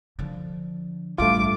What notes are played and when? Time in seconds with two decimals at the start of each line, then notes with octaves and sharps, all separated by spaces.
0.19 D3 F3
1.18 A1 G2 A3 F4 D6